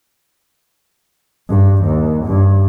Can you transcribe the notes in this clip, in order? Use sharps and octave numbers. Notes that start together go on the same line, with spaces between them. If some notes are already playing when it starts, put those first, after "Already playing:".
G2
D#2
G2